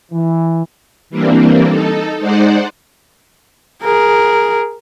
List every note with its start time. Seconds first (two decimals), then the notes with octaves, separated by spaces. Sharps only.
0.12 E3
1.10 E3 G3 A#3 C4 D4
1.69 D#4 A4
2.19 G#3 D#4 C5 D5 F#5
3.83 G#4 A#4